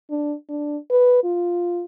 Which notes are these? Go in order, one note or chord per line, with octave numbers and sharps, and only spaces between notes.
D4
D4
B4
F4